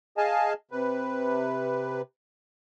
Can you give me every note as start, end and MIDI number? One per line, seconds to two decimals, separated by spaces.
0.17 0.53 68
0.17 0.53 75
0.17 0.53 77
0.17 0.53 80
0.17 0.53 81
0.71 2.02 48
0.71 2.02 71